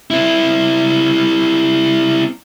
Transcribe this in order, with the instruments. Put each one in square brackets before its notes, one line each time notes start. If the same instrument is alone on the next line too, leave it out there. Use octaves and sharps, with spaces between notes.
[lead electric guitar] C4 E4